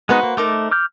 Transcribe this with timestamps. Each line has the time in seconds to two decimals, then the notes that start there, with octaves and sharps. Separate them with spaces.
0.09 G#3 B3 D#4 F#4 B4 C5
0.23 A#3
0.37 A3 D#4 A#4 C5 D6
0.71 D6 F6 G6